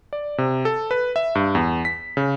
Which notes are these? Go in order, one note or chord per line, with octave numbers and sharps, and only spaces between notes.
D5
C3
A4
B4
E5
G2
E2
B6
C#3